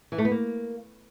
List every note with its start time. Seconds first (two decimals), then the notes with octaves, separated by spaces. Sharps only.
0.12 E3
0.18 A3
0.25 B3
0.31 A#3